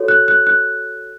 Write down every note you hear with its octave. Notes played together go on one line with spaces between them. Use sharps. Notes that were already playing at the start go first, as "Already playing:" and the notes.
Already playing: F#4 A4 C#5
F#6
F#6
F#6